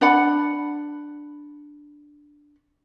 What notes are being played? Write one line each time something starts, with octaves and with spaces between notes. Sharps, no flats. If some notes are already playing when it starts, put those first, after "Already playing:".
D4 D5 F#5 B5